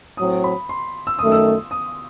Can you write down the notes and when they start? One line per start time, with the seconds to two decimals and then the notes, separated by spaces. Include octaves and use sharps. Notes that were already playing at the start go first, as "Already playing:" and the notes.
0.17 A2 F#3 C4 D#6
0.44 B5
0.69 C6
1.07 E6
1.19 F#2 D#3 A3 D#6
1.32 E6
1.71 D#6